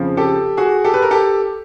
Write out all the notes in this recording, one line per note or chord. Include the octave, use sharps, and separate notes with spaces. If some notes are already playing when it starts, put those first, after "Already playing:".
Already playing: F2 C#3 F3
G4 A4
F#4 G#4
G4 A4
B4
A#4
G4 A4